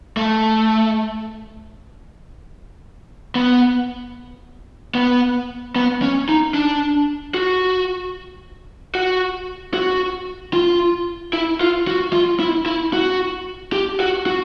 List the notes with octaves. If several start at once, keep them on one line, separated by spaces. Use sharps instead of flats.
A3
B3
B3
B3
C#4
D#4
D4
F#4
F#4
F#4
F4
E4
F4
F#4
F4
E4
E4
F#4
G4
F#4
F#4